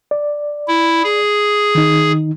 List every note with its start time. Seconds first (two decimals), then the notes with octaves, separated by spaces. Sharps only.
0.11 D5
0.68 E4
1.04 G#4
1.75 D#3 D#4